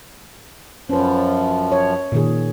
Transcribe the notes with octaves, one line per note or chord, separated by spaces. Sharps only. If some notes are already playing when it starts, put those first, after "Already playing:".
F#2 F3 C#4 B4
C#5
A#2 D#3 G#4